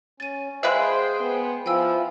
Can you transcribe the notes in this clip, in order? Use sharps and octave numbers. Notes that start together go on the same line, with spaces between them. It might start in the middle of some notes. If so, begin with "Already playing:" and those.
C#4 A6 D#7
G#3 G#4 B4 C5 E5 F5 G5 B5
B3
F3 E4 F4 G5 G#5 E6